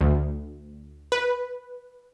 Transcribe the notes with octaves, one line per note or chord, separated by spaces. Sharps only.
D2
B4